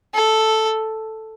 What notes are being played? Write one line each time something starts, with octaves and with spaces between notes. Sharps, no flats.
A4